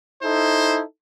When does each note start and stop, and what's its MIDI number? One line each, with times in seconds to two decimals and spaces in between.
0.23 0.81 63
0.23 0.81 64
0.23 0.81 69
0.23 0.81 72